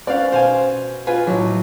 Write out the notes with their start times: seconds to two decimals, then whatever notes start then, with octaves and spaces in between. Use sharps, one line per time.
0.07 C#4 B4 C5 D5 F5
0.32 B2 C5 F5 G#5
1.07 F4 B4 G#5
1.27 B1 A2 F#3